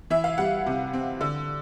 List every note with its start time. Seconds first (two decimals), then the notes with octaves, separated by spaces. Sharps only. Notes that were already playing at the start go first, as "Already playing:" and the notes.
0.10 E3 E5
0.24 F5
0.38 G3 F#5
0.66 C3
0.93 C4
1.21 D3